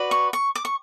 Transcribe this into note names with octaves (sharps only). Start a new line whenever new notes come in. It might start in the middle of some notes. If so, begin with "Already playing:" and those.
Already playing: F#4 B4 D5
C#6
C#6
D6
C#6